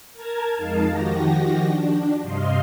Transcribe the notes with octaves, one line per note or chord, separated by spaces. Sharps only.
A#4 A5 A#5 G#6
F2 G#3 D#4 A#4 F5 A5
D#3 F3 F#4 G4 A#6
D4
G2 C3 D#5 F5 C6